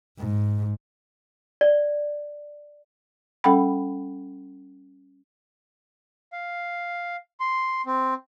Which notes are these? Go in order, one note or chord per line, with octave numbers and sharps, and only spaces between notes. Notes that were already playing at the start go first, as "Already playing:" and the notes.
G#2
D5
G3 C#4 A4 F#5 G5 B5
F5
C6
C4